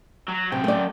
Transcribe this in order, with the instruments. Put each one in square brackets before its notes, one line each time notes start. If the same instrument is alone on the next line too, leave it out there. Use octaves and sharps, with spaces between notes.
[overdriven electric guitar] F#3
[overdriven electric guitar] F#2 G5 [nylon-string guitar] C3
[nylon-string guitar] A3 D5